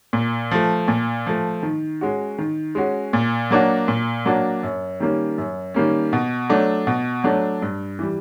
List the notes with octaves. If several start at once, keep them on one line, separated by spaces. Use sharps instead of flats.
A#2
F3 A3
A#2
F3 A3
D#3
G#3 C#4 F#4
D#3
G#3 C#4 F#4
A#2
F#3 A#3 D4 F#4
A#2
F#3 A#3 D4 F#4
F#2
D#3 G3 A#3 C#4
F#2
D#3 G3 A#3 C#4
B2
F#3 A3 D4
B2
F#3 A3 D4
G2
E3 G3